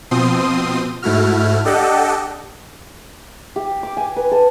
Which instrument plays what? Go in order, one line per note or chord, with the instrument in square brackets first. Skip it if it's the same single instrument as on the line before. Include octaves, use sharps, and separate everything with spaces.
[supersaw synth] B2 F3 C4 C6 D#6
G#2 A3 E4 F#4 F6
D4 G4 A4 D#5 F#5 G5
[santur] G4
D6
G#5
B4
A4